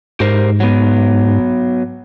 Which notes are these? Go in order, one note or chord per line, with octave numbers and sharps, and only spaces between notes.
G#2 G4 A#4 C5
F#3 B3